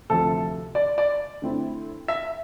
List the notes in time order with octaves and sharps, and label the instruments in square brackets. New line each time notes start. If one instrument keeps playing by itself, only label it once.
[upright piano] D2 C3 F3 A3 [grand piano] A4
[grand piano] D5
D5
[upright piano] D3 A3 C4 E4
[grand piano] E5